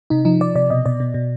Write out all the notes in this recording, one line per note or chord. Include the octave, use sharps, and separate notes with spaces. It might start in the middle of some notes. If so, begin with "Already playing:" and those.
C3 D#4
F3 D#4
F3 D5
C3 D5
B2 D#5
B2 D5
B2
B2